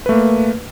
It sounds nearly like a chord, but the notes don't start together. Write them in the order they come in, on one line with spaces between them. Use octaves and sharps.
B4 A3 A#3